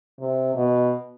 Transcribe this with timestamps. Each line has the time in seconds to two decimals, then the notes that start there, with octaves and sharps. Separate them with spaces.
0.19 C3
0.55 B2